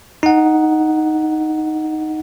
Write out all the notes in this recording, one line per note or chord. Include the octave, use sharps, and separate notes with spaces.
D#4 F#5